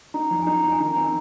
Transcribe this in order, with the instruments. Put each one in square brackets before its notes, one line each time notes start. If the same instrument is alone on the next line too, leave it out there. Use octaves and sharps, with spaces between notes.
[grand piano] D#4 [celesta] A#5
[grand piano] F2
[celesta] G#5
[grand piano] D#4 [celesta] A#5
[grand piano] F2 [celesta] A#5
[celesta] G#5
[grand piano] D#3 [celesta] A#5
[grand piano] C4 [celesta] G#5